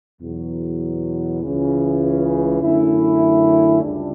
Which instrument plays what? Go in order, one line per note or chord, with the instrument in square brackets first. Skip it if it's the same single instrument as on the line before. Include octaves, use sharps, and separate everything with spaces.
[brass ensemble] E2 B2 F#3
C#2 C#3 E3
F#2 D3 A3 C#4 E4
C#2 C#3 G3 D4